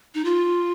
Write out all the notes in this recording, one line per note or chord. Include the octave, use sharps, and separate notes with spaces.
D#4
F4